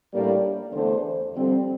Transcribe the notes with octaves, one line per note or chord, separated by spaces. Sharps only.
A2 G3 A#3 D4 D5
E2 D3 A3 D4 C5
F2 D3 G3 C4